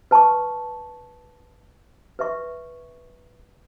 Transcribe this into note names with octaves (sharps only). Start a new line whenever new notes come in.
B4 A5 C#6
B4 E5 C#6